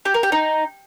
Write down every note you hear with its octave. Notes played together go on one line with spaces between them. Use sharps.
G4
A#4
G4
D#4